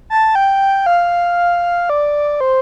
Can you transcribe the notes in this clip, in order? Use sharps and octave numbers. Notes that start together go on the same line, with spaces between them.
A5
G5
F5
D5
C5